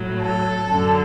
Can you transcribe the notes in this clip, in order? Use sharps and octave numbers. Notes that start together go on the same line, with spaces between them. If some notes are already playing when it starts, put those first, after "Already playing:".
Already playing: A2 F#3
A4
F#2 D3 F#3